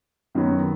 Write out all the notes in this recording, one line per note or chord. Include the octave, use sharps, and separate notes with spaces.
F#2 D#3 F#3 B3